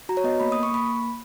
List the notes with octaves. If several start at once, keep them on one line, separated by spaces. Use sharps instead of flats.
F#4 A#5
C#5
B3 D#5
A#3 B5
A#3 D#6
C#6
A#3 B5